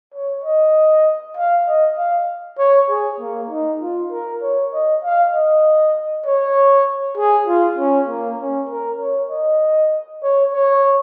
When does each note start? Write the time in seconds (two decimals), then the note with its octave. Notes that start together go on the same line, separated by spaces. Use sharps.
0.14 C#5
0.44 D#5
1.37 F5
1.67 D#5
1.97 F5
2.58 C#5
2.89 G#4
3.20 A#3
3.50 D#4
3.81 F4
4.12 A#4
4.42 C#5
4.73 D#5
5.04 F5
5.33 D#5
6.26 C#5
7.17 G#4
7.47 F4
7.78 C#4
8.09 A#3
8.39 C#4
8.69 A#4
9.01 C#5
9.30 D#5
10.23 C#5
10.53 C#5